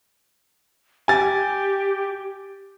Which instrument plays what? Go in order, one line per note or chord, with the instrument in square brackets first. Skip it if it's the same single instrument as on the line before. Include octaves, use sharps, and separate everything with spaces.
[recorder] G4 [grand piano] G#5 A6